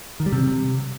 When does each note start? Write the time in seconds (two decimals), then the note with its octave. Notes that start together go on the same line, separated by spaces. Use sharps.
0.20 D#3
0.26 G3
0.33 C3